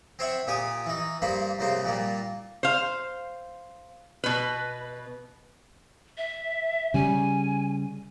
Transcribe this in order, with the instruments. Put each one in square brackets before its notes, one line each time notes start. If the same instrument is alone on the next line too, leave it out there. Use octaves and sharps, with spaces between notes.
[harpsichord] C4 C5 C#5 E5 F#5
A#2 G4 G#5 D#6
E3 D#4
G2 A#3 C5 B5
C2 C#3 A#3 C5
A#2 G3 A#3
[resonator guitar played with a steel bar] C5 F5
B2 B4
[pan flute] E5
[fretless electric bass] C#3 G3 [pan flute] G#5